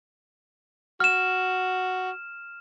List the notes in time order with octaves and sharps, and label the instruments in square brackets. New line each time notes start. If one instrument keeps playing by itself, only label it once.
[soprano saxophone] F#4 [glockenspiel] F6 E7